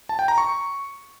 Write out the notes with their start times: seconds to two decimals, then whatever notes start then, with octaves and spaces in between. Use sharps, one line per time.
0.09 A5
0.19 G5
0.28 A#5
0.38 C#6